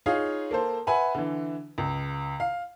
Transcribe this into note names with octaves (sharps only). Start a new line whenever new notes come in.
D#4 F4 G#4 C#5 F5
A#3 A4 C5
B4 E5 F#5 G#5 B5
D3 E3
C#2
F5